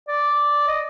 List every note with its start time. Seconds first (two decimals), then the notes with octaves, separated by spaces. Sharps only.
0.08 D5
0.68 D#5